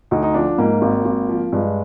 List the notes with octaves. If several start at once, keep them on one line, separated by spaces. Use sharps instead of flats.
D2 D#4
D#4
F3 D4
G#2 A#3
G#1
G#1
F3
G2 G#3